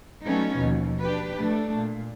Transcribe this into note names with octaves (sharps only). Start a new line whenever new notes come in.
F#3 G3 A3 B3 C#4 D#4
D#2 B2 E3 F3
D4 G4 B4
A2 A3 D4
A#2